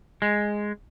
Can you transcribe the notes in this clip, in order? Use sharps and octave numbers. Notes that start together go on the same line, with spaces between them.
G#3